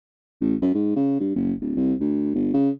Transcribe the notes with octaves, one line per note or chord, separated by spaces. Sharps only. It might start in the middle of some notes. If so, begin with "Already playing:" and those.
A1
F#2
G#2
C#3
G2
F#1
D1
C2
D2
G1
C#3